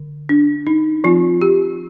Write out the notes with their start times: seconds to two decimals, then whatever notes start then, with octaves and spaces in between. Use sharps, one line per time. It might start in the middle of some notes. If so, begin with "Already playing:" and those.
Already playing: D3
0.29 D4
0.67 D#4
1.04 F3 C4 F4
1.41 G4